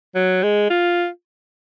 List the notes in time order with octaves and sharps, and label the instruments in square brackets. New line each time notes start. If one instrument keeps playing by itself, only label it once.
[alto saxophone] F#3
G#3
F4